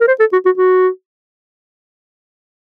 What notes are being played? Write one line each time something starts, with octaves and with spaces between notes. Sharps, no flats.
A#4
C5
A4
F#4
F#4
F#4